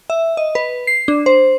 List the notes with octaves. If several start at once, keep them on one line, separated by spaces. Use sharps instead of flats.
E5
D#5
B4
C7
D4
C5